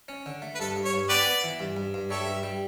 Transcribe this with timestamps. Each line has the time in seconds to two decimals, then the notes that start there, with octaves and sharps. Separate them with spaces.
0.09 C#4
0.26 D3
0.42 A3
0.55 B4
0.60 G2 A4
0.76 G2
0.85 C#5
0.94 G2
1.09 B3 G4 B4 D5
1.26 B3
1.44 E3
1.60 G2
1.77 G2
1.94 G2
2.10 G3 A4 C#5 E5
2.27 G2
2.43 G3